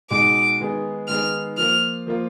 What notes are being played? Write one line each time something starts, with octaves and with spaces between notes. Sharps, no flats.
B2 G#3 D#4 G#4 D6
D#3 G#3 B3 D#4 G#4
D#3 G#3 B3 D#4 G#4 F6
F3 A#3 F4 F6
F3 A#3 F4